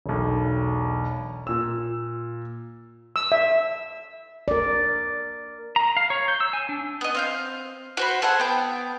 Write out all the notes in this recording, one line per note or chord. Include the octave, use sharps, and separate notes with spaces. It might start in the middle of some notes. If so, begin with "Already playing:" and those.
E1 B1
A#2 E6
E6
E5
A#4 D5
A#5
F5
C#5
G6
E6
G#5
D4
B3 D#5
C4 F5 G6
F#4 C5 B5
G#4 A4 C5 F#5
B3 G5